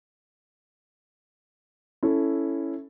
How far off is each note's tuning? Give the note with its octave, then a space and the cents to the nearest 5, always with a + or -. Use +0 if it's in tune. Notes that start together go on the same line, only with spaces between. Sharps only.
C#4 +0 E4 +0 A4 +0